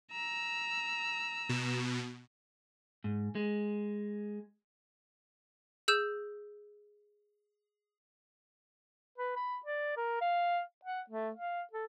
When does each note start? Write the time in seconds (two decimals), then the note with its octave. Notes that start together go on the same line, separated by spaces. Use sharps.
0.12 A#5 E6
1.49 B2
3.04 G#2
3.35 G#3
5.88 G#4 E6 G6 E7
9.18 B4
9.36 B5
9.65 D5
9.96 A#4
10.21 F5
10.85 F#5
11.10 A3
11.36 F5
11.72 A4